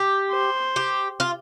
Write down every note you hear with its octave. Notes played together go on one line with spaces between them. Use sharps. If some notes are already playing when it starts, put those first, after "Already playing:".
Already playing: G4
C5
G4
F4